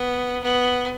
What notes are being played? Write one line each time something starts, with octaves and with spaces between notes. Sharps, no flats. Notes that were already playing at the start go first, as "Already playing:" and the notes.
Already playing: B3
B3